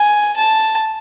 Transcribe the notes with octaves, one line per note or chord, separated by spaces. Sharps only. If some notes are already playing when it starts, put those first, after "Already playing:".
Already playing: G#5
A5